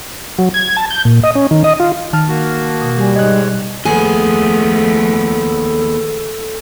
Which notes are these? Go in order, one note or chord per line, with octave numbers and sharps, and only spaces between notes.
F#3
G#6
A5
G6
A#2
D#5
C#4
D#3
D#5
F4
D#3 A5 F6
A#3 F#4
B2
G3 G4 G#5
G#2 G#3 C#5 D#5 F#6
D#2 F3 A3 B3 G#4 A4